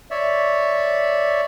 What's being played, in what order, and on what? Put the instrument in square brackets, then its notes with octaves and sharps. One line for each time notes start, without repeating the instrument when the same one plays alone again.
[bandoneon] C#5 D5 E5